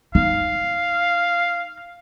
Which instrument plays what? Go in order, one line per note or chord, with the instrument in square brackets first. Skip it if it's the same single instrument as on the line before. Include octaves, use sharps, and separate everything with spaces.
[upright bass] D#4 [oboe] F5